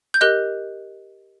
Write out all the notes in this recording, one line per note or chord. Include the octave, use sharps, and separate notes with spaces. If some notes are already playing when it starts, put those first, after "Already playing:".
G6
G4 A#4 D#5 F#6